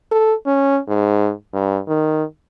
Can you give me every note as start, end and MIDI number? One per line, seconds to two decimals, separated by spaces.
0.12 0.34 69
0.46 0.79 61
0.88 1.32 44
1.54 1.79 43
1.88 2.24 51